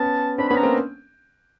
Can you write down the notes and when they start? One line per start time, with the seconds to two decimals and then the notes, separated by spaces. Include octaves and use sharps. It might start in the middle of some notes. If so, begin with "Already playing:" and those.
Already playing: B3 C#4 A5
0.38 C4 D4 B5
0.49 B3 C#4 B5
0.57 A#5
0.63 A#3 C4